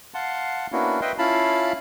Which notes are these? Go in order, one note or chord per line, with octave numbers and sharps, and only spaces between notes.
F5 F#5 A5 C6
A#3 B3 C#4 D4 E4 F#4
B4 D#5 E5 G5 C6
C#4 E4 F4 F5 A5 B5